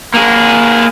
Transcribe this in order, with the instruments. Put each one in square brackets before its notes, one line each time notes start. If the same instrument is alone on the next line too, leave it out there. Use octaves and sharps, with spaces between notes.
[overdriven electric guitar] A#3 G#4